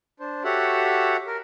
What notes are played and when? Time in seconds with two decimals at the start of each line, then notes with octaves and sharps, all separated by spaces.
0.20 D4 C5
0.44 F#4 G4 A4 C#5 E5 F#5
1.27 A#4